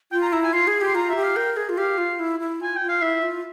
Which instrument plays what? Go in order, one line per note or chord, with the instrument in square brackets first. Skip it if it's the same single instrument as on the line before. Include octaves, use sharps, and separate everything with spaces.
[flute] F4 [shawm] G5
[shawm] A#5
[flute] E4 [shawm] A#5
[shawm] G#5
[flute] F4 [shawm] C6
[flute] G#4
G4
[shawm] C6
[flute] F4 [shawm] A#5
[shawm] E5
[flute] G4
[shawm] F5
[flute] A#4 [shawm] G5
[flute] G#4
F4
[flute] G4 [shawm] F5
[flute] F4
E4
E4
[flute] F4 [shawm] G#5
[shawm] G5
[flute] F4
[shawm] F5
[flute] E4 [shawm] E5
[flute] F4